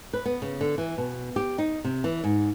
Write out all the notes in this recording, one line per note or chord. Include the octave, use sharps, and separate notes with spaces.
B4
B3
C#3
D3
E3
B2
G4
D#4
C3
E3
G#2